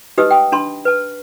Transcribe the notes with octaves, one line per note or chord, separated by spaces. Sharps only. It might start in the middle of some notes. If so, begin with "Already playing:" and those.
D#4 G4 B4 D#5 D#6 E6
G5 D#6
D4 A5 B5 C6
B4 A5